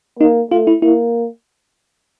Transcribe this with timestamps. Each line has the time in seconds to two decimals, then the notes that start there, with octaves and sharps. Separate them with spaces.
0.19 A#3 D#4
0.51 A3 F4
0.67 E4
0.82 A#3 E4